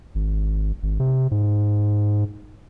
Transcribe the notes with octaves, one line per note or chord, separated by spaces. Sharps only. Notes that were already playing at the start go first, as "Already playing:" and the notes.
G#1
G#1
C3
G#2